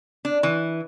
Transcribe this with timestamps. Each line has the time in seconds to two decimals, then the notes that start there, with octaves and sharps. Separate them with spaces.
0.25 D4
0.43 E3